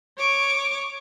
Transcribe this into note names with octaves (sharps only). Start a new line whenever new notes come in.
C#5 C#6 D6